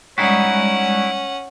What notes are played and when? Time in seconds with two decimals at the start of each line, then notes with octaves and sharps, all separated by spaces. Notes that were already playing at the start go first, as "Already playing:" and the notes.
0.18 G3 G#3 C#4 D#4 E4 F#4 D5 F#5